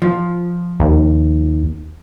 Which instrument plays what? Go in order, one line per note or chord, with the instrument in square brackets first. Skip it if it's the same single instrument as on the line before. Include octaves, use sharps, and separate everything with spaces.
[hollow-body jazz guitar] F3
[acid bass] D#2